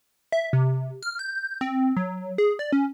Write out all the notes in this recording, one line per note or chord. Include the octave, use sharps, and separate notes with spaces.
E5
C3
F6
G6
C4
F#3
G#4
D5
C#4